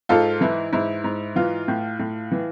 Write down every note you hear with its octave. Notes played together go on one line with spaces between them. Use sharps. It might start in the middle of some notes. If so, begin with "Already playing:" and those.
G#2 F4 A4
E3 E4
G#2 E4
G#2
E3 F4
A2
A2
E3